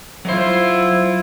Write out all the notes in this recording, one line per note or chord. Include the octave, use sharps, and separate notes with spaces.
F#3 E4 F4 C5